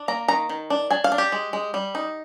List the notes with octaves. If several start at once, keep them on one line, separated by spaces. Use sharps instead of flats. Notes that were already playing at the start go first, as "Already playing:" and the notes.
Already playing: D4
A#3 A#5
D#3 A#5
D#3
D4
D4 G#5
F5
D4
G4
G#3
G#3
G3
D#4